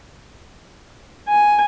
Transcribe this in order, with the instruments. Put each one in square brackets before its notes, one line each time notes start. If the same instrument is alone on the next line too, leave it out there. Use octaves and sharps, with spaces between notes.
[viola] G#5